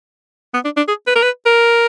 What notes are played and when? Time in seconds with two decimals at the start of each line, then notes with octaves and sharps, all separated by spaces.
0.54 B3
0.65 D4
0.77 D4
0.88 G#4
1.07 B4
1.15 A#4
1.23 B4
1.46 A#4